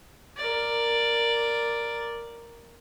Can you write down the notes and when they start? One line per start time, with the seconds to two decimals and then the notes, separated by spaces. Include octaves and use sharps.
0.37 A#4 D5